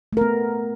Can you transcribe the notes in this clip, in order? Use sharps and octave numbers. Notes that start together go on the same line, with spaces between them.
A3 B3 A#4